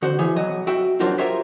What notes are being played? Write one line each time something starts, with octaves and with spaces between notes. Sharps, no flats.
D3 F#4 C5
E3 G#4 C#5 E5
B1 F#3 D#5
F#4 E5 G5
F#3 D4 F4 F#4 A#4 C5
F4 G4 A#4 C5 C#5 E5